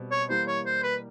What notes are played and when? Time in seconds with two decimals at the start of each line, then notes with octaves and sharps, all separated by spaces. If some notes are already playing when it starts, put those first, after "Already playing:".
Already playing: B2 G3 C4
0.11 C#5
0.29 E3 G3 A#3 C5
0.48 C#5
0.66 C5
0.83 B4